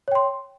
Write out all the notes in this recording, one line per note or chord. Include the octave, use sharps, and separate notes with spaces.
C#5 G5 C6